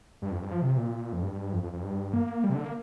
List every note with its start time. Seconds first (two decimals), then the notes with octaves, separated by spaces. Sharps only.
0.22 G2
0.31 F2
0.42 G2
0.51 F3
0.62 C3
0.77 A#2
1.13 F2
1.23 G2
1.53 F2
1.63 F2
1.73 F2
1.83 G2
2.14 A#3
2.44 G3
2.50 C3
2.55 D3
2.64 A#3